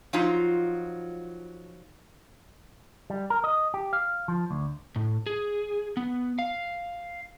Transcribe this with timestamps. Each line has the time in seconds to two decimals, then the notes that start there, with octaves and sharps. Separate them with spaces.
0.13 F3 F#3 D#4 F4
3.10 G3
3.30 A#4
3.44 D#5
3.74 G4
3.93 F5
4.28 F3
4.51 D2
4.96 A2
5.26 G#4
5.97 B3
6.39 F5